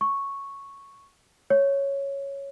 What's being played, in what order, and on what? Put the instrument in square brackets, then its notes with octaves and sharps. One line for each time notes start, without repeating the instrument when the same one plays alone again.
[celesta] C#6
C#5